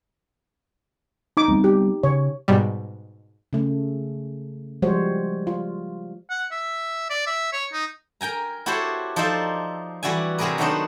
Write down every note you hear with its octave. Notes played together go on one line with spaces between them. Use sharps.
D#4 D6
G3 B3 C4
G4
C#3 C#5
G#2 B2 G3
C#3 A3
F3 G3 G#3 F#4 C5 C#5
F4
F#5
E5
D5
E5
C#5
D#4
A#4 G5 G#5 A#5
E4 F#4 G4 A4 C5 C#5
F3 D#4 A4 C5 D5 E5
E3 G3 F#4 D5 E5 G#5
C3 C4 F#4 G#4 A#4 B4
D#3 F#3 A3 B3 D4 C5